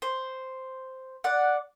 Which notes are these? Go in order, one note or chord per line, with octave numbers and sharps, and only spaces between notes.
C5
D5 F#5